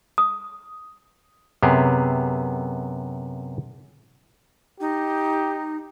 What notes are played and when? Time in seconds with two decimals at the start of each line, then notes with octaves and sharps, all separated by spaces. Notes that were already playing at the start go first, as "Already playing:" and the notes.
0.18 D#6
1.63 F#2 C3 B3 G4 G#4
4.81 D#4 G4